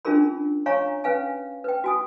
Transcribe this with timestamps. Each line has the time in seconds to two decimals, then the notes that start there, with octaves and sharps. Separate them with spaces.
0.05 C#4 D4 F4 G#4 A#4 B5
0.66 C#5 F5 G#5 A#5 C#6
1.04 C#4 B4 F5 G#5
1.64 B4 G5
1.84 F#4 G#5 D#6